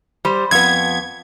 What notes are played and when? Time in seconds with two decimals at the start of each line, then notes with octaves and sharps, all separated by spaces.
0.25 G3 C5
0.51 F2 B3 G#6